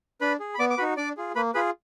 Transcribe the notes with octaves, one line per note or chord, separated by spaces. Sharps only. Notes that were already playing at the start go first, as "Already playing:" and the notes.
D4 B4 B5
G#4
B5
B3 D5 D6
D6
D#4 F#4 B4 B5
D4 D5 D6
F4 G#4
A#3 B4 B5
F4 G#4 B4 B5